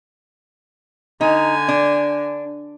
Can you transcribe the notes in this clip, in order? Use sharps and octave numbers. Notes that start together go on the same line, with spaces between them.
D3 D#4 G#5
D4